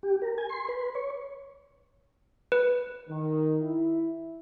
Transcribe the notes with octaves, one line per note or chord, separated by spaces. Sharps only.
G4
A#4
G#5
C6
B4
C#5
B4
D#3
E4